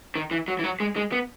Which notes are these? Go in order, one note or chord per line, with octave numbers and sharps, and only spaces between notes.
D#3
E3
F#3
E3
F#3
G#3
G#3
B3